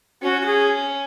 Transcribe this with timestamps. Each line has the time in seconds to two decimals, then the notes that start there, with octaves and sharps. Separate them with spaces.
0.22 C#4 F#4
0.41 F#4
0.46 G#4